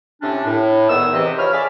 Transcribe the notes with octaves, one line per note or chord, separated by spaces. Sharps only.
A2 C3 C#4 D4
A2
E2 D#3 B3 G#4 E6
C3 E3 D#5
F3 C#5 B5 F6
G#4 D5 E5